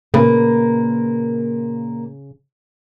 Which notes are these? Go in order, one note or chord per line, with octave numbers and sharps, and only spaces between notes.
A#2 C#3 A#3 B4